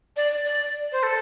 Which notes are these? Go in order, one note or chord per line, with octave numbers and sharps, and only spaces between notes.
D5
D5
C5
A4